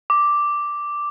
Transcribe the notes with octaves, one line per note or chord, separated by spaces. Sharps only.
D6